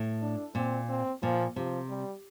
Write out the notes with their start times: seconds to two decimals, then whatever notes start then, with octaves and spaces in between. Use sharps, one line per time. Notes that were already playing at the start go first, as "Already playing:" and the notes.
Already playing: A2
0.22 D4
0.55 A#2 C4
0.89 C4
1.23 A#2 F3
1.56 C3 F3
1.89 G3